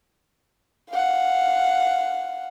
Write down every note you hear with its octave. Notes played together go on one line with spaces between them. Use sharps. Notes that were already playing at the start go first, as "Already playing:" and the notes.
F5 F#5